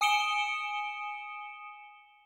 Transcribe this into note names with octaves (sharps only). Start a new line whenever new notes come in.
G#5 D#6 C#7 D7 E7 G7